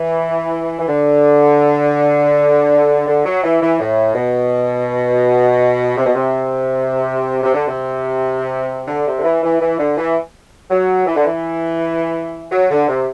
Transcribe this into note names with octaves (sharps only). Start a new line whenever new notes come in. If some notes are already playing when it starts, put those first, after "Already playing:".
Already playing: E3
E3
D3
D3
F#3
E3
E3
A2
B2
C3
B2
C3
C3
D3
C3
D3
C3
D3
E3
E3
E3
D3
E3
F#3
E3
D3
E3
F#3
D3
C3